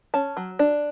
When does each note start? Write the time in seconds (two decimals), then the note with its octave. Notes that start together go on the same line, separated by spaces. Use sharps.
0.14 C#4 A5
0.37 F#3
0.59 D4